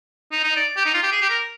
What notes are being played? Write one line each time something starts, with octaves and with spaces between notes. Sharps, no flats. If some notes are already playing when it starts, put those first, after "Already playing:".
D#4
D#4
D5
G4
D#4
F4
G4
G#4
G4
A#4